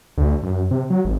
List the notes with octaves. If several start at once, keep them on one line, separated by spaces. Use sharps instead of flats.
D2
F#2
C3
F#3
G#1